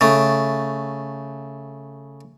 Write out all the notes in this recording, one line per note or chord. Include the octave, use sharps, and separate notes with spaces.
C#3 A3